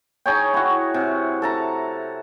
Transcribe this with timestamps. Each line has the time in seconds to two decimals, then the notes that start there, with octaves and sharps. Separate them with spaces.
0.26 D#4 G#4 C#5 G5
0.54 E4 F#4
0.94 C3
1.42 A4 A5 A#5